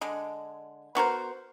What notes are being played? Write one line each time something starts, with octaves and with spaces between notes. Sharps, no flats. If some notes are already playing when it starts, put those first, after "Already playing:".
D3 G#3
B3 F#4 A#4 C5